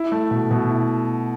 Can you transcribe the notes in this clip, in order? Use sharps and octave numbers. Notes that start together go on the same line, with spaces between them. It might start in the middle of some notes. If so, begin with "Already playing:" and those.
Already playing: E4
A3
B2
B2
E4